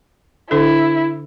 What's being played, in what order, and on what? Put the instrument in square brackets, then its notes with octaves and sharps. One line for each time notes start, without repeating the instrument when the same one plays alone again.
[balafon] D3 D4 A4 [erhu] E4